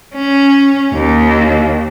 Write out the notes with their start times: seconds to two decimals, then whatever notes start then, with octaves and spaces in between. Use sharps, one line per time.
0.15 C#4
0.93 D#2